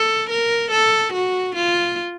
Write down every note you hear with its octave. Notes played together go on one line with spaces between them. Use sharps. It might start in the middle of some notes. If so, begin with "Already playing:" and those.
Already playing: A4
A#4
A4
F#4
F4